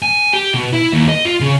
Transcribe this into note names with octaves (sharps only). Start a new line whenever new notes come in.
G#5
G4
B2
E4
D#2
D#5
F4
C#3